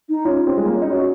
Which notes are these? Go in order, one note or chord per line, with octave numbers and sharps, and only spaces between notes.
D#4
C#4 F4
C4
G#3
A#3
C#4
D#4
C#4 F#4